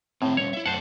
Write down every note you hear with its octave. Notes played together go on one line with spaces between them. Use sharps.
A2 C4 G#4
G3 C#4 C#5
E4 E5
F#2 A3 C5 F#5 A5